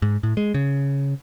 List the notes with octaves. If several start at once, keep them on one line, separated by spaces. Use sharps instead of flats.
G#2
A2
G#3
C#3